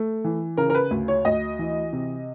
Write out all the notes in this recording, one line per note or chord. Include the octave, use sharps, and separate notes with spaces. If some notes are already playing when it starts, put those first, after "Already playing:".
Already playing: A3
E3
C#3 A#4
A#4
B4
D2
C#5
D2 D#5
E3
C3